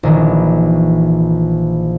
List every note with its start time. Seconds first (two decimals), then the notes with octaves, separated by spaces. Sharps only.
0.03 A#1 D#3 E3